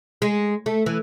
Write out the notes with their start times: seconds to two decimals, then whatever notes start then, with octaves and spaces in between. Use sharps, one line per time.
0.22 G#3
0.66 A3
0.86 E3